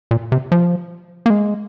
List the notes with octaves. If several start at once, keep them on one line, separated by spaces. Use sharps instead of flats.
A#2
C3
F3
A#3
G#3